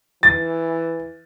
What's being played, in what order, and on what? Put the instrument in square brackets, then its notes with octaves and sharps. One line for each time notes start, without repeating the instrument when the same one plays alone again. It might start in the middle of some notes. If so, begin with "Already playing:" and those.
[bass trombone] E3 [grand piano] A6